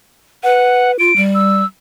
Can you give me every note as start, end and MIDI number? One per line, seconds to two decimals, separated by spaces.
0.44 0.99 71
0.44 0.92 78
0.99 1.12 65
0.99 1.21 98
1.16 1.62 55
1.35 1.65 88